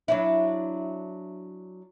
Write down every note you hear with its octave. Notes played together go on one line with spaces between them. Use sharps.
F#3 D4 E4